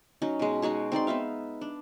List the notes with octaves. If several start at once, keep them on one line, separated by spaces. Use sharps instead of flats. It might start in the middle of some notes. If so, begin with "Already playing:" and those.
F#3 C#4 D#4
B2 G#3
G#3 D#4 F#4 C#5
C4 D#4 D5 C6
B3 D#4 E5 F5
D4